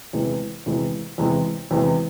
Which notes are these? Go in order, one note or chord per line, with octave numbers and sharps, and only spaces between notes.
E2 C3 E3 G#3
E2 C3 E3 G#3
E2 C3 E3 G#3
E2 C3 E3 G#3